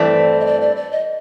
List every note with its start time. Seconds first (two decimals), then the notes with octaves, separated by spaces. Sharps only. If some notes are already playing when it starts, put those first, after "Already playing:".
Already playing: G2 E3 A3 C4 D5
0.40 D#5
0.46 D5
0.61 D5
0.76 D5
0.91 D#5